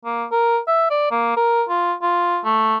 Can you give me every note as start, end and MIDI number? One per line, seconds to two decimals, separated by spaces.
0.05 0.25 58
0.32 0.59 70
0.68 0.88 76
0.90 1.06 74
1.11 1.36 58
1.37 1.64 70
1.69 1.93 65
2.02 2.39 65
2.45 2.77 57